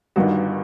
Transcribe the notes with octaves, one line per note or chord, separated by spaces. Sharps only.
G1 G2 D#3 F#4